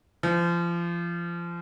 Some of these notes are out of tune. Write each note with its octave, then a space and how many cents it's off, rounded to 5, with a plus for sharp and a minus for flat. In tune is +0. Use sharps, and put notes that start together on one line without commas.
F3 -30